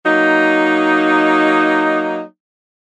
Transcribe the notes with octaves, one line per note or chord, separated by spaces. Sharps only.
F#3 A#3 D#4